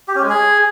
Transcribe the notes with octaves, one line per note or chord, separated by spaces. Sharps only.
G4
C#4
G#3
G#4